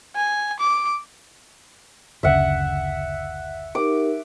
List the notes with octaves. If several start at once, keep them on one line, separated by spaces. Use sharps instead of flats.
G#5
D6
F#1 D2 C#3 E5 F#5
D#4 G4 A#4 D6